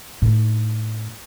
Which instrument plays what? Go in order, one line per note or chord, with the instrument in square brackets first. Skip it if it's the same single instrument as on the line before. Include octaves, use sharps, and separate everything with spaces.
[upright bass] A2 D#4